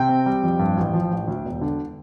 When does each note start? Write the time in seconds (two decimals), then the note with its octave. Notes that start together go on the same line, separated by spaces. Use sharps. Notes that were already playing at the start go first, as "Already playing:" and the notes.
Already playing: C3 G5
0.09 C4
0.26 G3
0.43 F2
0.59 G2
0.77 A1
0.93 F3
1.11 A1
1.27 D2
1.45 E1
1.61 D3